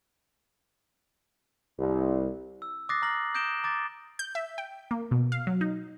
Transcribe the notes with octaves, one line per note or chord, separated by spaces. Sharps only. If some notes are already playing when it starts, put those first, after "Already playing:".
C2
E6
D6 D#6 F#6 A6 A#6 C7
A#5 F6 F#6 A#6 C7 F#7
D#6 G6 A#6 D7 E7 G7
A#5 D6 A6
G6
E5
G5
A#3
B2
F5
F#3
D#4